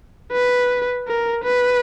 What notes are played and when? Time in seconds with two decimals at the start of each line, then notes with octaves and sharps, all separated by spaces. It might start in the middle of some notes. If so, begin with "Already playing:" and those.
0.32 B4
1.08 A#4
1.44 B4